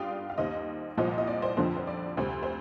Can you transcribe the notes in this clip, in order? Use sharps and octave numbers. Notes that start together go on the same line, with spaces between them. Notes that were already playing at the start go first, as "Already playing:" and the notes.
Already playing: G2 G3 D5 F5 G5 C6 D#6
F5
D#2 D#3 G3 C5 D#5
C2 A#2 F3 C5 D#5
D#5
D5
C5
F2 D3 F3 C5
C5
D5
D2 C3 G3 C5
C5